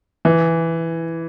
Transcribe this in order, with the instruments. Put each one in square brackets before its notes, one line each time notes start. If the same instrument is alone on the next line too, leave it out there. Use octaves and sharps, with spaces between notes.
[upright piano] E3